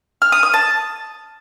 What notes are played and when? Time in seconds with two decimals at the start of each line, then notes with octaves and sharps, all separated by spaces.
0.22 F6
0.32 D#6
0.43 D#6
0.54 A5